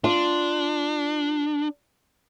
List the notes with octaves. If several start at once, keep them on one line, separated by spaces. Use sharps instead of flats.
D4 F4